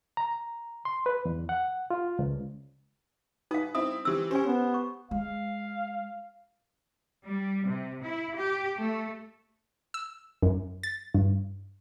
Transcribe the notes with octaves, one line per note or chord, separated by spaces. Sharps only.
A#5
C6
B4
E2
F#5
F4
C#2
D#4 B4 F5 D#6
C4 E4 D#6
E3 C4 G4 E6
C#4 G4 C5 G#5
B3
C#6
G#3 F5
G3
C3
E4
G4
A3
E6
F#2
A6
G2